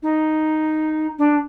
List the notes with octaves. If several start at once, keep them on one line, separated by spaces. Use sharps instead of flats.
D#4
D4